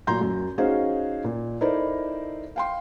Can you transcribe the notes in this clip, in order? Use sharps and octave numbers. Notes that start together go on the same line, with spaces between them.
A#2 F#3 A#5 C6 G6
F#2
C#4 D#4 F#4 G#4 C5 F5
A#2
D#4 E4 A4 A#4 C5 D5
F5 G5 C6